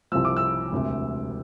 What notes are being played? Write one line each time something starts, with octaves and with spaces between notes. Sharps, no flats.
C2 C3 F3 E6
D6
E6
E1 D2 C3